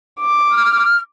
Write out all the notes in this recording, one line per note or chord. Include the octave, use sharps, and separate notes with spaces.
D6
F6